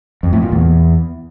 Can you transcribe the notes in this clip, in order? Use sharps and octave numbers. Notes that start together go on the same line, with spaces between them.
F2
A2
A#2
E2